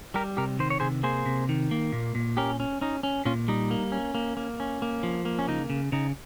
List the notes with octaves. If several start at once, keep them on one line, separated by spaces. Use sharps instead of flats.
G3 G4 A#4
C3 G4 A#4
D#3 C5
C#5
C3 G#4 C5
A#3 G#4 C5
C3
D#3
A#3
A#2
A#2
C#4 G4 A#4
C#4
C#4 D#4
C#4
A#2 C#4 F4
G3 D#4
A#3
C#4
A#3
A#3
C#4
A#3
F3
A#3
C#4
C#3 D#4
C#3
C#3 D#4